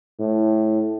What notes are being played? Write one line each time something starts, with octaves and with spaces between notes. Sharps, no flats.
A2